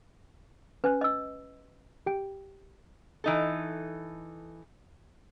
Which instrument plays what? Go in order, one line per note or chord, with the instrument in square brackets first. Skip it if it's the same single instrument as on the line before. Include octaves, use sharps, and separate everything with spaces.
[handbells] C#4 G#5 F#6 [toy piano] B4
[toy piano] D#5 E6
[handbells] G4 G5
[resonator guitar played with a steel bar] E3 D#4 A4